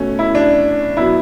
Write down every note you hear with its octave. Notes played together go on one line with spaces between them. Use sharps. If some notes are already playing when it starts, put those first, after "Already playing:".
Already playing: B2 A3 C#4
E4
D4
B2 F#3 B3 E4